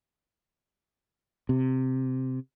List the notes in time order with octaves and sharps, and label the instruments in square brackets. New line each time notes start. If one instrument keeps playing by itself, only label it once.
[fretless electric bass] C3